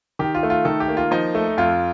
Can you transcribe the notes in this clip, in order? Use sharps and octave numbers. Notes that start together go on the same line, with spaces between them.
D#3 G4
F4
A3
F4
D#3 A4
G4
A#3
F4
F3 D#4
A3
F2 F4